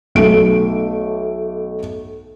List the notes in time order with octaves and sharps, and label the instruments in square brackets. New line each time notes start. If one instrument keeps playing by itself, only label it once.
[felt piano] B1 A3 D7